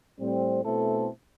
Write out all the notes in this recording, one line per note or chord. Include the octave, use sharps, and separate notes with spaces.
A2 G3 C4
B2 A3 C4 E4 A4